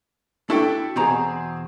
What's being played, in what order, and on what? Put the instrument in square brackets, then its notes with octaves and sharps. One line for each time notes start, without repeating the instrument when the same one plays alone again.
[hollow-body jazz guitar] D4 F#4 [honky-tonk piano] E4 A4 G5
[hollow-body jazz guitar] E2 B2 A#5 [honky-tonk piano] C4 G#4